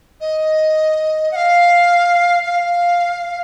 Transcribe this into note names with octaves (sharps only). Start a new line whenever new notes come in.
D#5
F#5
F5
F5